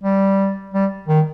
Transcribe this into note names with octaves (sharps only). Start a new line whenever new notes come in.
G3
G3
D#3